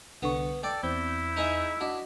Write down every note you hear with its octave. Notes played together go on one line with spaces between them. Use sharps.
C2 D3 B3 C#6
A4 D5 G5 D6
E2 C4 E4 G6
D#4 G#4 E5
D4 F#4 D#5